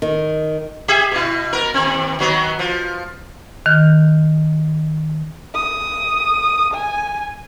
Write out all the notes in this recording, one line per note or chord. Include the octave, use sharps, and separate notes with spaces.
D#3
G4 G#4 E5
B2 E4
B3 A#4
D#2 C4
D#3 F#3 B3
F3
D#3 F6 G6
D#6
G#5